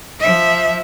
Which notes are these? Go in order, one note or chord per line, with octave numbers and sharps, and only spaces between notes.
F3 E5